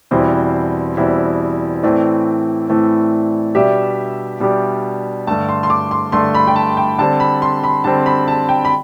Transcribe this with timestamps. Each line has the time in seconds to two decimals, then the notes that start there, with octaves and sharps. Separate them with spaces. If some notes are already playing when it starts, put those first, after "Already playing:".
0.11 E2 B2 G3 C4 E4 C5
0.97 E2 B2 G3 C4 E4
1.83 A2 E3 A3 C4 D5
2.68 A2 E3 A3 C4
3.55 B2 G3 D4 G4 E5
4.40 B2 G3 D4 G4
5.27 G2 D3 A3 A5
5.49 C6
5.63 C6
5.70 D6
5.91 C6
6.12 G2 D3 A3 C6
6.34 B5
6.47 G5
6.56 A5
6.77 G5
6.98 D3 G3 C4 A5
7.20 B5
7.42 C6
7.63 B5
7.84 D3 G3 C4 A5
8.06 B5
8.28 A5
8.49 G5
8.65 B5